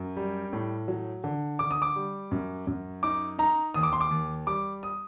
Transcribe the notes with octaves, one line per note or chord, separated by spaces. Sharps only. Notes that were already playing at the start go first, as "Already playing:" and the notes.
Already playing: F#2
G3
A2
F#3
D3
D3 D6
D#6
D6
G3
F#2
F#2
D#4 D6
D#4 A#5
D#2 D#6
D6
C6
D6
D#2
G3 D6
D#6